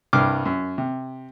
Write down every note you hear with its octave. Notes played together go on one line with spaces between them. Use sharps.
C2 G2 D6 F6
F#2
C3